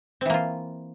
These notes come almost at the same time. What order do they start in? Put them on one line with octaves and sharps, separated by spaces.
C4 E3 A#3 F4